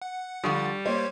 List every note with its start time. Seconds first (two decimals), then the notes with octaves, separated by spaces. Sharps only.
0.02 F#5
0.44 D3 F3 G3 A4 C#6 D#6
0.85 A#3 G4 C5 C#5 G#6